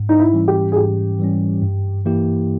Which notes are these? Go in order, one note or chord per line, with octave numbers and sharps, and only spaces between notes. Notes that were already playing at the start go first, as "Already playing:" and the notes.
Already playing: G#2
D#4
E4
E3 G3 C#4
G4
G#4
G#2 G4
E3 G3 C#4
G2
E3 A#3 E4 G4